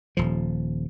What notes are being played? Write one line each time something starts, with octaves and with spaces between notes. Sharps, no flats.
D#1 F3